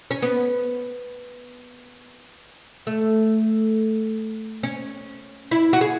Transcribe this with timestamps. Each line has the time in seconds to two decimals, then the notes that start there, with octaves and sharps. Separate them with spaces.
0.11 C#4
0.22 B3
2.87 A3
4.63 C#4
5.51 E4
5.73 F#4
5.81 G#4